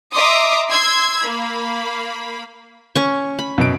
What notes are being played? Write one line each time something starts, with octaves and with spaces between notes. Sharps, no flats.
D#5 E5 A#5 C6 D6 D#6
C6 E6 G#6
A#3 B5
C#4 C#6
B5
F#2 B2 D7